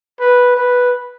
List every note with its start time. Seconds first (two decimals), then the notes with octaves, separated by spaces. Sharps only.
0.20 B4
0.57 B4